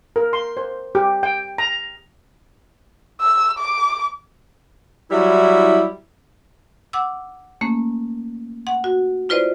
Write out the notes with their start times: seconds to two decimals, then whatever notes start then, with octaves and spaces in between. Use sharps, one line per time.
0.16 A#4
0.33 C6
0.57 C5
0.95 G4
1.23 G5
1.58 A#5
3.21 E6
3.59 D6
5.11 F#3 G3 E4
6.93 F#5 D6 E6
7.61 A3 A#3 C#4
8.67 F#5
8.84 F#4
9.29 E4 F4 B4 C5 D5 D#5